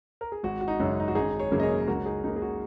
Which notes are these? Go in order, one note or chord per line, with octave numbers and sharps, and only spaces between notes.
A#4
G#4
G#1 F#4
F#4
D#4
F#2 C#3 G#3
D#4
F#4
G#1 D#4 G#4
G#4 C#5
F#2 C#3 F#3 A#3
D#5
G#4 C#5
C#2 F#4 A#4
D#4 G#4
C#3 A#3 D#4
G#4
F#4